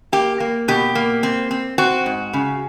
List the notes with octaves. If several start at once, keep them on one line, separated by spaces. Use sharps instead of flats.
A#3 G4
A#3
B2 G4
A#3
C4
C4
C4 F#4
G#2
C#3